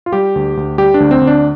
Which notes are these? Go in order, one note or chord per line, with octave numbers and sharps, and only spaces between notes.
F4
G3 G4
D2
D2
G3 G4
D4
D2
C4
D2
D4